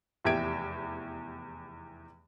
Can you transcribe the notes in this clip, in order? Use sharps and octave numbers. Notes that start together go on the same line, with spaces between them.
F1 E2 G4 E5 G#6 D7